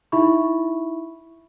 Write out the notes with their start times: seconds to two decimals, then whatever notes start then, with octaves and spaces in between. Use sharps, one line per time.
0.12 D#4 E4 E5 B5 C#6